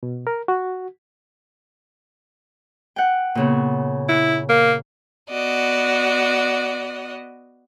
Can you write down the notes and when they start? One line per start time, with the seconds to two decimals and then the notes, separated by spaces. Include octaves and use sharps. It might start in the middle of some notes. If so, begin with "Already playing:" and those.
0.03 B2
0.27 A#4
0.48 F#4
2.96 F#5 G5
3.35 A#2 C#3 B3
4.09 E4
4.50 A#3
5.29 B3 F#4 D5 D#5